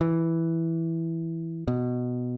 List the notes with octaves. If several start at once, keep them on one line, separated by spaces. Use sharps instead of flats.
E3
B2